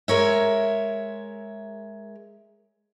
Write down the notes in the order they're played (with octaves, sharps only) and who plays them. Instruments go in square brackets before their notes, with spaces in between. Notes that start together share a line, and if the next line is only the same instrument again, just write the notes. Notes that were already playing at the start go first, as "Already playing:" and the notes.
[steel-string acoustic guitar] G#3 A#4 C#5 E5